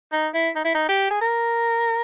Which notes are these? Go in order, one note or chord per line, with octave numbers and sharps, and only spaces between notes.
D#4
E4
D#4
E4
D#4
G4
G#4
A#4